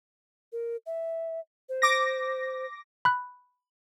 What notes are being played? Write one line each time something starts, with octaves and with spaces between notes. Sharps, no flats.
A#4
E5
C5
D6 A#6
B5 F#6